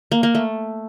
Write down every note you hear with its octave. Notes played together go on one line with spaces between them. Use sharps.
A#3
A#3
A3